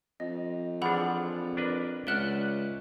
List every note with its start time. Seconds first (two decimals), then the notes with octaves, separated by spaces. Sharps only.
0.20 F2 D#5
0.82 E3 F3 D4 G#4 F#5 B5
1.57 D4 A#4 B4
2.07 C#2 D5 E5 F#5 F6 F#6 G7